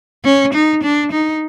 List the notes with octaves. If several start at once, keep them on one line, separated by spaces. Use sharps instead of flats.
C#4
D#4
D4
D#4